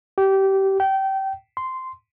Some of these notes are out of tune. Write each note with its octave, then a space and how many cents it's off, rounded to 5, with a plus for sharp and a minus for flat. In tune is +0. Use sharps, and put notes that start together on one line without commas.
G4 -20
G5 -25
C6 -10